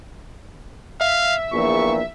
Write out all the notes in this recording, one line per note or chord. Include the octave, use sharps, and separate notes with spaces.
E5 F5
A#1 E2 A#2 C#6